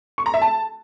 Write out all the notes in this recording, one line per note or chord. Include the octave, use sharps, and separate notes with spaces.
C#6
A#5
E5
A5